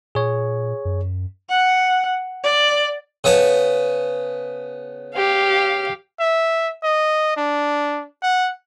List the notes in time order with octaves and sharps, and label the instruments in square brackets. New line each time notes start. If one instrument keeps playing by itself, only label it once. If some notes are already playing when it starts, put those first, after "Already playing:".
[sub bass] A#2 [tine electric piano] G#4 C#5
[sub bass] F#2
[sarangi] F#5
D5
[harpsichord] C#3 B3 A5
[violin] G4 F5
[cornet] E5
D#5
D4
F#5